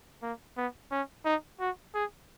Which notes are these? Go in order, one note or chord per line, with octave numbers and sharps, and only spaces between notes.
A#3
B3
C#4
D#4
F#4
G#4